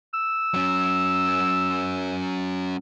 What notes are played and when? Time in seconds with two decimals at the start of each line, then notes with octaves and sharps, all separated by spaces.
0.14 E6
0.54 F#3 C#4